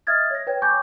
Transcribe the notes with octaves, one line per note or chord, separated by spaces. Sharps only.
D#5 E5 D#6 F6 G#6 A6
C#5 A#6
B4 C#5 G5 G#6
G#5 B5 C#6 D6 G6 G#6